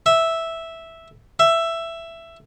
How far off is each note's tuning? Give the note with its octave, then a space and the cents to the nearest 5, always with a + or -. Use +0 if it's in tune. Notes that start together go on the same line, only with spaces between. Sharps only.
E5 -5
E5 +10